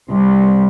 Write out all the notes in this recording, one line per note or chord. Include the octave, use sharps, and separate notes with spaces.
C2